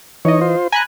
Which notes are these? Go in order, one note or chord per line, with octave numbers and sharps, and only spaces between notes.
E3 D#4 C#5 D#5
F4 C5
G#5 A#5 B5 F#6